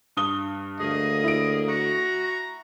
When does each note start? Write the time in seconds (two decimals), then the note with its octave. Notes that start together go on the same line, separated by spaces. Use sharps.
0.17 G2 D#6 G7
0.80 D2 A#3 G#4 D#5
1.24 E4 D7
1.69 F#4 A#5